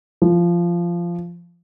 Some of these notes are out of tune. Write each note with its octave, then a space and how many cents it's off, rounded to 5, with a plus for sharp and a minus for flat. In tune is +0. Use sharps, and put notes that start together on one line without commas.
F3 -15